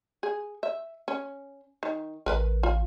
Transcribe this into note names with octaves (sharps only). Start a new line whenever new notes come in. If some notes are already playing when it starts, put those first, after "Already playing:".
G#4
E5
C#4
D#3
A1 A#4 B4 B5
F4